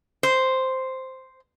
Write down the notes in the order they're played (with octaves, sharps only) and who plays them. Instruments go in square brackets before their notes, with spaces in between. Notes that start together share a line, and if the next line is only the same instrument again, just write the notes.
[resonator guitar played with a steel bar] C5